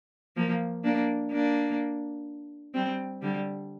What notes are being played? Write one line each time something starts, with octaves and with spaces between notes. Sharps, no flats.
F3 A#3
A#3 D4
A#3 D4
G3 C4
D3 G3